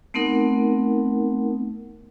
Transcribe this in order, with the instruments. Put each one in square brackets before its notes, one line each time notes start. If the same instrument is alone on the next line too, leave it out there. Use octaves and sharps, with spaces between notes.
[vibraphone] A3 B3 C4 D#4 A#4 F#5